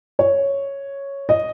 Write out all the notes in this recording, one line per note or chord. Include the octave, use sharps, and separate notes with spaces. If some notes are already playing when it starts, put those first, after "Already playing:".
C#5
D#5